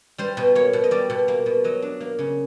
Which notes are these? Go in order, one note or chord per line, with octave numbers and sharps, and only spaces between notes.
G3 C5
B2
A#3 C#5
B2
D#5
G3 D5
B2
A#3
B2
F#3 D#5
D4
A#3
C#3